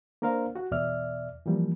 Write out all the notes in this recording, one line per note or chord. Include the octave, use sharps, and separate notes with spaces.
A#3 D4 A#4 C5 F5
F#4 F#5
E2 B2 D5 E5 F6
E3 F3 G3 A#3